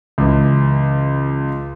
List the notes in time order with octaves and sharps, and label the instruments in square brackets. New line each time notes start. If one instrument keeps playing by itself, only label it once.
[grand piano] C#2 E3